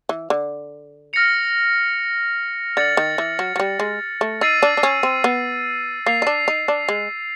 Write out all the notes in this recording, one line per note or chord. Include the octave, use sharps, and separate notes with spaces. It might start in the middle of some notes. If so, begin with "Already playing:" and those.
E3
D3
F6 A#6 C#7 F7
D3 A6 C#7 F#7
D#3
E3
F#3
F#3
G3
G#3
A3
D#4 E6 A6 C7 D#7
D4
D4
C#4
C4
B3
A#3 A6 C7 F7
D#4
D4
D#4
D4
G#3